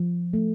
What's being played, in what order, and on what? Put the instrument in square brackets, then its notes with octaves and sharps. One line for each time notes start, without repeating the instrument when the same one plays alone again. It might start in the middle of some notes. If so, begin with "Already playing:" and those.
Already playing: [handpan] F3
A3